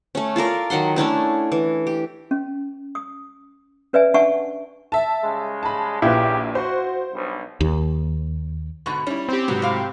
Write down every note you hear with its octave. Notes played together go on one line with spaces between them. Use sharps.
A3 C#4
F4 A4 A#4 D5
D#3 F#3 F#5 C6
A3 C#4 D4 E4
E3
G4
C#4
D#6
C#4 B4 D5 E5 G#5
D4 E5 F#5 G#5 A5 C#6
E5 A5
C#3 G3 G#3
A5 B5
A#1 C#3 E4 F4 G4 B4
F#4 C5
B1 G2
D#2
G#2 B2 D3 C#6
G3 C#4 E4
C4 G4
G#2 C3 F#3 B3
A2 F5